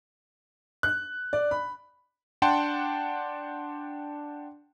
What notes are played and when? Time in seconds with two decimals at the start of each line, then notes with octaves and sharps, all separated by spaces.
0.83 F#6
1.33 D5
1.51 B5
2.42 D4 F#5 G5 A5 C6